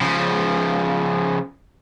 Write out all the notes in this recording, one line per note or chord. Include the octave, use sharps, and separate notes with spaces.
C#3 F3